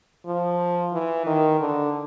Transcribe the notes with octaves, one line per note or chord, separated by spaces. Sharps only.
F3
E3
D#3
D3